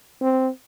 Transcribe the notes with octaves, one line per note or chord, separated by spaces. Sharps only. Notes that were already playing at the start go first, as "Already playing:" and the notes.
C4